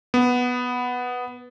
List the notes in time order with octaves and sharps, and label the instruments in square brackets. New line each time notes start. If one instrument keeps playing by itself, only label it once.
[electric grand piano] B3